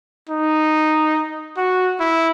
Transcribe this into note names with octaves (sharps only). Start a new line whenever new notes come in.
D#4
F#4
E4